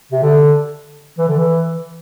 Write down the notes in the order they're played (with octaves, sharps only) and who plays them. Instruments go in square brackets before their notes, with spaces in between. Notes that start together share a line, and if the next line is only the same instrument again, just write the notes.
[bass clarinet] C3
D3
E3
D3
E3